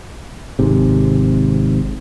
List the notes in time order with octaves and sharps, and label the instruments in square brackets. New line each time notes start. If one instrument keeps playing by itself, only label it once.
[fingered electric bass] G#1 G#2 C3